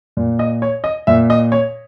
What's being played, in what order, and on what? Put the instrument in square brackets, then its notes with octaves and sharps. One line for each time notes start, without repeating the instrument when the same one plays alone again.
[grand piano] A#2
D#5
C#5
D#5
A#2 E5
D#5
C#5